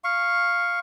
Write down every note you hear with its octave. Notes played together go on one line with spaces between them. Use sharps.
F5 C#6